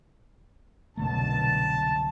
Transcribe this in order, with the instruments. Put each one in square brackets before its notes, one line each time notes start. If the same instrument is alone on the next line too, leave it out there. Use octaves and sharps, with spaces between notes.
[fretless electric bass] C2 D3 A3 [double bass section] F#2 B2 [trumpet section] A5